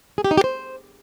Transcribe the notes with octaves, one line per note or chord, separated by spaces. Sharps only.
G#4
G4
D#4
G4
C5